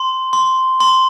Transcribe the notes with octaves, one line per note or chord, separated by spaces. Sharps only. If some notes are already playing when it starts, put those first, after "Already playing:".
Already playing: C6
C6
C6